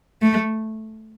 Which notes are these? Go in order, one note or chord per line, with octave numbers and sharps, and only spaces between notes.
A3